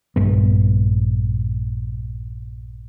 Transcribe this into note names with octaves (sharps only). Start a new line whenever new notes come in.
A#1 G2 B3